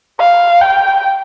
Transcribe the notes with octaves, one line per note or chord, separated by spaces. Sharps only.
F5
G5